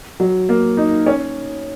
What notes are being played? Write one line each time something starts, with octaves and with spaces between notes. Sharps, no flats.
F#3
A#3
D#4
C#4